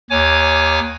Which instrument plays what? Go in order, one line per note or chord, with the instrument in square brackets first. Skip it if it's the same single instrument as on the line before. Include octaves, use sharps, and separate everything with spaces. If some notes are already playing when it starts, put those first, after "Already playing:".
[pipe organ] D#2 C#5 G#5 D6